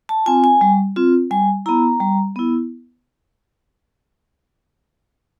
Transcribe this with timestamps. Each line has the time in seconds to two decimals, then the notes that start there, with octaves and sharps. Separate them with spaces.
0.09 A5
0.26 C4 F4 G#5
0.44 G#5
0.61 G3
0.96 C4 F4
1.31 G3 G#5
1.66 B3 E4 A#5
2.00 G3
2.36 B3 E4